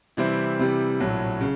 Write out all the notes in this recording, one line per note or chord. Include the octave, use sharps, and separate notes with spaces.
C3 E3 G3 C4 E4
C3 E3 G3
A#1 A2 F#3
C#3